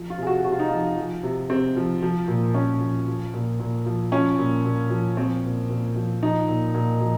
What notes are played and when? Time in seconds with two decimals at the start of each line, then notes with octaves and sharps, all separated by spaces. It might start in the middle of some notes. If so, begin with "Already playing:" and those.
Already playing: F3
0.10 F4
0.18 C3 G#4
0.27 F#4
0.44 C3 F#4
0.52 F4
0.60 D#4
0.68 F3 F4
0.97 F3
1.23 C3
1.50 C3 C4
1.76 F3
2.02 F3
2.28 A#2
2.54 A#2 C#4
2.81 F3
3.08 F3
3.34 A#2
3.60 A#2
3.86 F3
4.12 F3 C#4
4.38 A#2
4.65 A#2
4.90 F3
5.17 F3 C4
5.44 A#2
5.70 A#2
5.96 F3
6.23 F3 D#4
6.48 A#2
6.75 A#2
7.01 F3